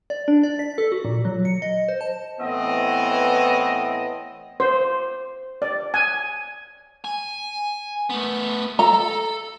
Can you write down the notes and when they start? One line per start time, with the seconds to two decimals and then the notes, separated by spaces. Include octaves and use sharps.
0.10 D5
0.28 D4
0.43 D5
0.59 B6
0.78 A4
0.92 F#4
1.05 A#2
1.25 F#3
1.45 C#7
1.62 D#5
1.89 C5
2.01 A5
2.40 A2 E3 B3 C4 D#5
4.60 C5
5.62 D5
5.94 G#5
7.04 G#5
8.10 A3 B3
8.79 A4 A#5